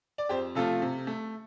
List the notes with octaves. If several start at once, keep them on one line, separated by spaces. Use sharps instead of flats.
D5
F2 G4 C5
C3 F3 A3 F4 A4
C3
A3